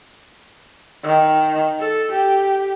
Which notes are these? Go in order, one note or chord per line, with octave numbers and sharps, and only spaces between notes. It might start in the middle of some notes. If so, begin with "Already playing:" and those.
D#3
A4
G4